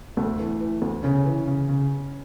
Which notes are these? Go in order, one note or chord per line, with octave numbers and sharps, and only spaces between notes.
D2 A3
E3
E3
D2
C#3 C#4
E3
C#3
C#3